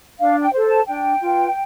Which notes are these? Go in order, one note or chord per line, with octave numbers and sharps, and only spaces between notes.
D4 F5
G5
A4 C5
A5
D4 G5
F4 B4